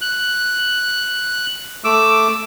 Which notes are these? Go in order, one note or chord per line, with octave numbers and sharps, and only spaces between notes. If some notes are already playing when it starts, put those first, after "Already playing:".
F#6
A3 D6 E6